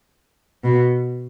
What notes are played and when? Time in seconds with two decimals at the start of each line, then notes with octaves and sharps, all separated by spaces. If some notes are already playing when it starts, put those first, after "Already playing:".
0.64 B2